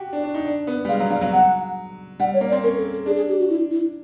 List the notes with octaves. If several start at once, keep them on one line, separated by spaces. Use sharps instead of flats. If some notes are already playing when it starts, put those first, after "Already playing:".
Already playing: F#4 G4
D4
D4
D#4
D4
B3
G3
G#3 F5
F#3
G3 F5
F#3
F#3 F#5
G3 F#5
C#5
A#3
D5
C4
C#4 A#4
A4
A4
D4 G#4
G#4
G4
F#4
E4
E4